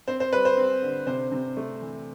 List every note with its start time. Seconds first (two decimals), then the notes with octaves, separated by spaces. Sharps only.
0.08 C4 C5
0.20 C5
0.33 G3 B4
0.45 C5
0.57 C4
0.82 D3
1.07 C3 C5
1.32 C3
1.57 A3
1.81 E3